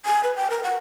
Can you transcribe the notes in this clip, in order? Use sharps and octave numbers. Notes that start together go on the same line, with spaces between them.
G#5
B4
G5
A#4
F#5